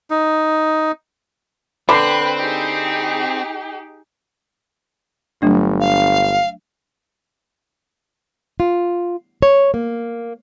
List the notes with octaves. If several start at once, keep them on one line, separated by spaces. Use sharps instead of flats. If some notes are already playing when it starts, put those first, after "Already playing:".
D#4
D3 C4 B4 G5 B5 F#6 C7
D#4 G4 G#4
G1 F#3 A3 D4
F5
F4
C#5
A#3